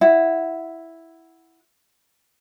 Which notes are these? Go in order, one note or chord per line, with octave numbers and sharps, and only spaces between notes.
E4 F#5